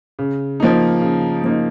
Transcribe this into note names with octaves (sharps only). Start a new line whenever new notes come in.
C#3
F3 A#3 D#4
C#3
F3 A#3 D#4